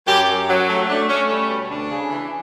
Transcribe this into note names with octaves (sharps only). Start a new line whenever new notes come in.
F#2 G4
F#2
F#3
A3
A3 D4
A3 C#4
G3 C#4
B2
D2 D4
C#3
E3